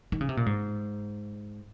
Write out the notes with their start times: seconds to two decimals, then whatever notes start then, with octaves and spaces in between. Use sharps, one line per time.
0.12 D#3
0.21 C#3
0.29 C3
0.37 A#2
0.46 G#2